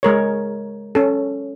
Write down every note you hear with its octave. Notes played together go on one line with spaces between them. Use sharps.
G#3 A#4 C#5
C#4 A4